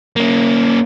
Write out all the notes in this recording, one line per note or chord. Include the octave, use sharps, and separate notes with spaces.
A#3 C#4